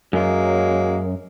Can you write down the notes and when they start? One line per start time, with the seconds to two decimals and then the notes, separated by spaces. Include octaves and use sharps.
0.13 F#2 F#3 G#3 A#3